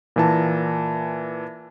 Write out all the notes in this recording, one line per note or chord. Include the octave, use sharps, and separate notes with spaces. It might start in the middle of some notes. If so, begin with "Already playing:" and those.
A#2 E3 A5